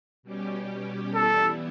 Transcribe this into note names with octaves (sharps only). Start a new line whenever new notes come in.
B2 G3 C#4 G4
E3 G3 B3 E4 A4